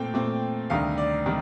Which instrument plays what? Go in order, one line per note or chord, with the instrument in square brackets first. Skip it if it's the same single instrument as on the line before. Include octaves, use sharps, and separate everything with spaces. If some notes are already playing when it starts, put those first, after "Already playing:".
Already playing: [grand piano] A#2 A3 C4 G5
A#2 A3 C4
D2 C3 D#3 G3 F5
D5
C3 D#3 G3